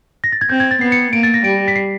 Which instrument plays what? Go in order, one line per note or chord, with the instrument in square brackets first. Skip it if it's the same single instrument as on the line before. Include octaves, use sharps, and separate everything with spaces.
[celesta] A#6
A6
G#6
[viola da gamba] C4 [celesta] G6
[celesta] G#6
A6
[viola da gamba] B3 [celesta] C7
[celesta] C#7
[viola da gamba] A#3 [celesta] D7
[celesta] A6
A#6
[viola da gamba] G3 [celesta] D7
[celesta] B6
C7